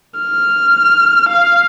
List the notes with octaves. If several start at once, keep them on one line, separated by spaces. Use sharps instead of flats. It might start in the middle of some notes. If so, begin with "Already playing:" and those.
F6
F5